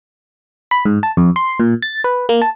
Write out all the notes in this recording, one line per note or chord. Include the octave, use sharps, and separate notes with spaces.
B5
G#2
A5
F2
C6
A#2
A6
B4
A#3
A5